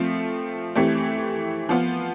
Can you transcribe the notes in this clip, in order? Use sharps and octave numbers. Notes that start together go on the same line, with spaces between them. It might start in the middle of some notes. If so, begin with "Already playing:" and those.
Already playing: F3 A3 C4 F4
E3 A3 C4 G4
F3 B3 F4